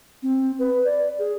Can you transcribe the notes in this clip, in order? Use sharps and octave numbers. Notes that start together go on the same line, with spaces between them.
C4
B4
D5
G#4